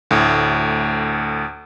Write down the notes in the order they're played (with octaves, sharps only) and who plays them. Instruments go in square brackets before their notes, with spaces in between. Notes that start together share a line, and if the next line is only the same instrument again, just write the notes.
[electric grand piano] D2 A2